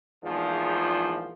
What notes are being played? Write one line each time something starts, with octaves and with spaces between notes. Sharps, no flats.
A#1 E2 G#2 F3